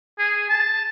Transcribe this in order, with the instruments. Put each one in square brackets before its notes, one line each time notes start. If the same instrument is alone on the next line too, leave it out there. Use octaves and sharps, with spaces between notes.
[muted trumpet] G#4
A5